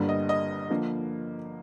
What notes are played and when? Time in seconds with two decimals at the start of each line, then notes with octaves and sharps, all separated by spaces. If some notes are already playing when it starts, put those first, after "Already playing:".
Already playing: G1 G2 D3 G3 A#3
0.09 D#5
0.29 D#5
0.70 D3 F3 A#3